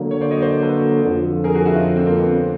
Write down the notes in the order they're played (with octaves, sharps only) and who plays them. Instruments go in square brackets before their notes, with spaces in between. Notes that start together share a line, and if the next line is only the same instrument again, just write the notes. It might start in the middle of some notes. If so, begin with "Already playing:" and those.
Already playing: [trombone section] D3 F#3 A#3
[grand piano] C#5
C5 D5
C#5 D#5
C5 D5
A4 B4
[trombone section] F2 D3 F3
[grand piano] G#4 A#4
F#4 G#4
E4 F#4
D#4 F4
C4 D4
A#3 C4
B3